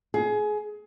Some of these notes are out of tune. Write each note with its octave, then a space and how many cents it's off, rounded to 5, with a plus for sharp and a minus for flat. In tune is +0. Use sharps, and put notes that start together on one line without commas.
G#4 +25